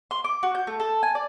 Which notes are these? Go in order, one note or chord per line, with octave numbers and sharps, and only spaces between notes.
C6
D6
F#4
G6
A3
A4
G#5
D5